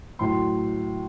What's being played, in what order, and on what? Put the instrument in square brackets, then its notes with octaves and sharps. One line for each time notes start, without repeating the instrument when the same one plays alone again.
[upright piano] A2 F#3 C6